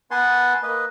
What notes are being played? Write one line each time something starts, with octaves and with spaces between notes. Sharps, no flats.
B3 B4 F#5 G#5 A5 C6
A#3 B4 D#5